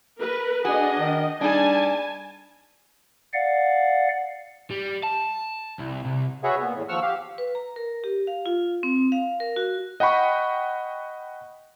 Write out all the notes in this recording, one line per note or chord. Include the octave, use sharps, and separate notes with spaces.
A#4 B4
D4 F#4 G#4 D#5
D#3
G3 D4 D#4 G#4 G#5 A5
D5 F5 F#5
G3
A5
C2
C2
F#4 G#4 B4 C#5 E5 F#5
A#2 B3
E2 A2
D#2 F3 F#5 C#6 E6 F6
G4 F5
B4
A#5
A#4
G4
F5
F4
C4
F5
A#4
F#4
D#5 F#5 G5 B5 C#6